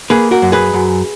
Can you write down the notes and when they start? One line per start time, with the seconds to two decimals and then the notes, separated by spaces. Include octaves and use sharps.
0.10 A#3 G#4 B4
0.31 F#4 A#4
0.42 F#2
0.52 G#4 B4
0.74 F#2